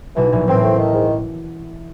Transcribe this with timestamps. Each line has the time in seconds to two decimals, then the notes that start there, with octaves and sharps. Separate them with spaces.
0.16 B1 B2 E3
0.31 A#1 A#2 E3
0.47 A1 A2 C4
0.63 A3
0.78 D#3
0.94 G#2